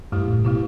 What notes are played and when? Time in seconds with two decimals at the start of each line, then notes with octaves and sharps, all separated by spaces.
0.12 G2 A3 E4 G4
0.28 A2
0.44 B2 A3 E4 G4